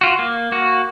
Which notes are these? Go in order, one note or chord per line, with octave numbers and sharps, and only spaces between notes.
F4 F#4
A#3
A#3 F#4